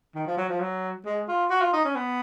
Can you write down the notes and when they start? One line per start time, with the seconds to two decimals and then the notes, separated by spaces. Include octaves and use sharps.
0.15 D#3
0.27 F3
0.37 F#3
0.49 F3
0.60 F#3
1.05 G#3
1.28 F4
1.50 F#4
1.61 F4
1.73 D#4
1.85 C#4
1.96 B3